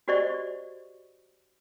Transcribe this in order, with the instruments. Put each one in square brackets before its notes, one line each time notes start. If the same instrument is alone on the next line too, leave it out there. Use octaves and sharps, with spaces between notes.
[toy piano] F#4 G4 C5 D5 D#5 C#6